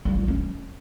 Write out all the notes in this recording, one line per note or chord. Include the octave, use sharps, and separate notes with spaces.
G3
F4
C#4